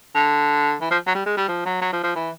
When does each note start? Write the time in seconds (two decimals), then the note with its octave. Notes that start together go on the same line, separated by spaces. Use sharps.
0.15 D3
0.81 E3
0.90 F3
1.07 F#3
1.15 G3
1.26 G#3
1.37 G3
1.48 F3
1.65 F#3
1.82 F#3
1.93 F3
2.03 F3
2.15 E3